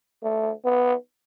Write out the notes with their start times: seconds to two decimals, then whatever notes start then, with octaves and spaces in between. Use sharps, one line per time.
0.23 A3
0.65 B3